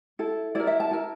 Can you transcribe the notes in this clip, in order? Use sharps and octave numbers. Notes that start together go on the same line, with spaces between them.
E4 A4
E4 A#4 D5
E5
A5
E4 A#4